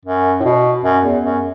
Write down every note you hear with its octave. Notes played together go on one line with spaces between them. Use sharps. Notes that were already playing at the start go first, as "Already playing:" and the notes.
F#2
A2
B2
F#2
E2
F#2